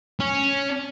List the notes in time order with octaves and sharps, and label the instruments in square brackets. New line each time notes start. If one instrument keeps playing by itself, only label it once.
[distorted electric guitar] C#4